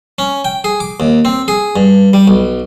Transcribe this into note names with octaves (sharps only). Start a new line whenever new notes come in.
C#4
G5
G#4
D6
D#2
C4
G#4
G2
G3
B1